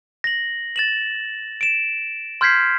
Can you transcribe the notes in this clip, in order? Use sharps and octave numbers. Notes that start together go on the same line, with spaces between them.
A#6 F#7
A6 E7 F#7
D7 E7
C6 F6 G6 G#6 B6 C7